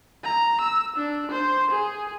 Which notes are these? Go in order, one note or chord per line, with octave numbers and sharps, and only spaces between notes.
A#5
E6
D4
C5
G#4